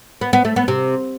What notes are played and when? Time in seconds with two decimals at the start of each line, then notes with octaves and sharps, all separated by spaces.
0.21 B3
0.33 B3
0.45 A3
0.56 B3
0.68 C3